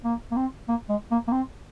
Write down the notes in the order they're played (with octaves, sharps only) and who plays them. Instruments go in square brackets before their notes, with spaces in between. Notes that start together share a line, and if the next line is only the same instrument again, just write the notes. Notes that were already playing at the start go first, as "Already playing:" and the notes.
[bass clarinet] A#3
A#3
C4
A#3
G#3
A#3
A#3
C4